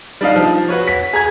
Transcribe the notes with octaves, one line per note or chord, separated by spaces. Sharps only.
G3 D4 D#4 F5
F3
F#4 B4 C#5
B6
G#4 A#5 G#6